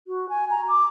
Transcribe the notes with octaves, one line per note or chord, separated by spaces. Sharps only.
F#4
G#5
A#5
D6